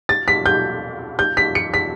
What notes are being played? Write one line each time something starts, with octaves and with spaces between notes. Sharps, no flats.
A6
B6
G6
G6
B6
C#7
B6